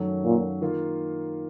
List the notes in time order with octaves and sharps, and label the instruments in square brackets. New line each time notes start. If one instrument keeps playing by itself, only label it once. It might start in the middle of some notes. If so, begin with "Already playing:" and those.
Already playing: [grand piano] F#2 D#3 F#3 A3 C#4
[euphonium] A#2
[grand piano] D#3 A#3 F4